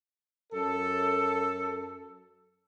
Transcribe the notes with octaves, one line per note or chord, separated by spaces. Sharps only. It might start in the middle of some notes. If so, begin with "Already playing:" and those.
F#2 A4